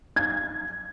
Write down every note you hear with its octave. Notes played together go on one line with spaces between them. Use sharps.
G#6